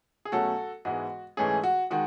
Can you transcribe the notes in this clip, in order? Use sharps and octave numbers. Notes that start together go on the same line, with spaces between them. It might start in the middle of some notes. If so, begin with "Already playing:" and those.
G#4
B2 F#3 A3 C#4 F#4 A4
G#2 E3 G#3 B3 F#4
G#2 E3 A3 C#4 G#4
F#4
D#3 G#3 F#4